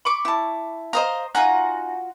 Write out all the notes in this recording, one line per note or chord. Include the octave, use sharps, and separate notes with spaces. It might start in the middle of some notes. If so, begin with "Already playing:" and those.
B5 C#6 D6
E4 A5
C5 D#5 F5 A#5
D#4 F4 F#4 F#5 G#5 A#5